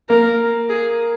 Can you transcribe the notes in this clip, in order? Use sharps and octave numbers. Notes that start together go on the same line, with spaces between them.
A#3 A#4
G#4